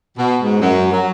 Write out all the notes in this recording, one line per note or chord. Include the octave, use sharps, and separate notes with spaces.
B2
G#2
F#2
F#3